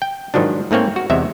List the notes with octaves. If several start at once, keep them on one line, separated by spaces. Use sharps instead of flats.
G5
G#2 D#3 F3 F#3 D4
G#2 A3 A#3 C4 C#5
F#4
E2 C3 G#3 E5